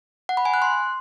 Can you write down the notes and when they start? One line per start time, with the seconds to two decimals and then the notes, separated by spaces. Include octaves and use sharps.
0.29 F#5
0.37 B5
0.45 G#5
0.54 F#6
0.62 C6